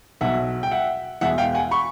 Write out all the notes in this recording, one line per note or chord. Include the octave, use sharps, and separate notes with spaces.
B1 B2 F#3 E5 F#5
G5
E5 F#5
E2 B2 G#3 E5 F#5
F5 G5
F#5 G#5
B5 C#6